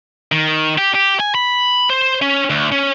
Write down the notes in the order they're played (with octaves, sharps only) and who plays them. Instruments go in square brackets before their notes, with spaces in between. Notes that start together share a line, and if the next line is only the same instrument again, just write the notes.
[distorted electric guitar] D#3
G4
G4
G#5
B5
C5
C#4
D2
C#4